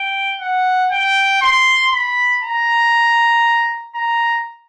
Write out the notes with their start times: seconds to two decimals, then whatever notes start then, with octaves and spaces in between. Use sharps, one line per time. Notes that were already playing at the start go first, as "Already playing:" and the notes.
Already playing: G5
0.41 F#5
0.91 G5
1.42 C6
1.93 B5
2.44 A#5
3.95 A#5